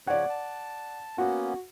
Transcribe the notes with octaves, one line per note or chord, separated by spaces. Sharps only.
C#3 F3 C#5 D5 F#5
A5
A#3 B3 C#4 F#4